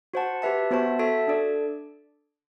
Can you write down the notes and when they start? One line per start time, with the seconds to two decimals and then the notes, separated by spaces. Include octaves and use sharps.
0.14 F#4 C5 F#5 A5
0.42 G4 B4 E5 A5
0.71 B3 F#4 C5 E5 A5
0.99 F#4 A4 E5 A5
1.27 D4 A4 D5